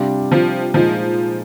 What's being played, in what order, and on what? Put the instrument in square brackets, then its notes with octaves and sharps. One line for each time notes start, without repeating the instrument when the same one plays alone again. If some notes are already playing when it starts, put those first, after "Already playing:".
Already playing: [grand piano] C3 G3 D4 F4
[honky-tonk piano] F3
[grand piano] A#2 G#3 D#4 [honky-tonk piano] F3